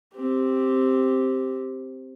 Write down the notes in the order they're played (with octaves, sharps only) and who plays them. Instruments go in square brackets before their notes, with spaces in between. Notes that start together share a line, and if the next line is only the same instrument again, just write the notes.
[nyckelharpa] C4 G4